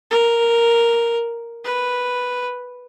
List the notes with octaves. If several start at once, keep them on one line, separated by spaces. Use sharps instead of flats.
A#4
B4